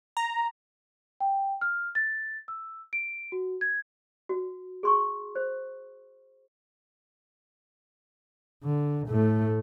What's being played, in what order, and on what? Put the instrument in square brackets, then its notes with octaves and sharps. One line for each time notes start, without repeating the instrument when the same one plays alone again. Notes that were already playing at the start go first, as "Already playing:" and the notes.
[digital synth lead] A#5
[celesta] G5
F6
A6
E6
D7
F#4
G#6
[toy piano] F#4
G#4 C6 C#6
C5
[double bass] D3
A2 A3